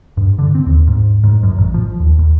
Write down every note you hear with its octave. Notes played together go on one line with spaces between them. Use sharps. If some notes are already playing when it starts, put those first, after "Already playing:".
G2
D3
C4
D#2
G#2
G#2
F#2
A1
F3
D#2
D#2